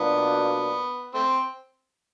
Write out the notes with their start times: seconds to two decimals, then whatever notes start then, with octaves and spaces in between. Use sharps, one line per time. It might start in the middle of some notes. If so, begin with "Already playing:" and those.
Already playing: B2 F#3 A#3 B3 D4 F4
1.14 A3 C4